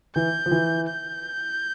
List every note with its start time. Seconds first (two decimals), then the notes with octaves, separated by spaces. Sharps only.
0.15 E3 G6
0.46 F3
0.51 E3
0.88 G6